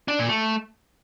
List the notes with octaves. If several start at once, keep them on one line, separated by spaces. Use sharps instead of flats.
D4
A#2
A3